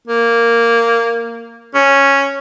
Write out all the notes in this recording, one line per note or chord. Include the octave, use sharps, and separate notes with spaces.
A#3
C#4